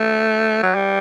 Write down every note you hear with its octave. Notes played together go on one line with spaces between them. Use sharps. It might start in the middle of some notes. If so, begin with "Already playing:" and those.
Already playing: A3
F#3
G3